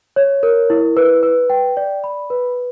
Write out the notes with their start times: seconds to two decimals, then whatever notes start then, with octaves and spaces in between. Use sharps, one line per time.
0.16 C#5
0.43 A#4
0.70 E4
0.97 B4
1.23 B4
1.50 G5
1.77 D5
2.04 B5
2.30 B4